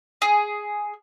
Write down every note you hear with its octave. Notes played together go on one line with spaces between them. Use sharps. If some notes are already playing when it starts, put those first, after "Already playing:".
G#4